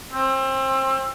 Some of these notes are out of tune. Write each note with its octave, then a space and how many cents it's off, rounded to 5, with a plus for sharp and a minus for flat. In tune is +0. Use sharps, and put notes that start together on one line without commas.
C4 +30